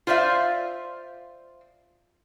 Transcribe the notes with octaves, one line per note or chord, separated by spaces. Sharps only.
F4 C5 D5 E5 F5